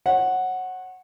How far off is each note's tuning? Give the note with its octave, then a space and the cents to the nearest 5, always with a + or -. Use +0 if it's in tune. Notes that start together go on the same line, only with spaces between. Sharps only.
C#5 -35 F#5 +0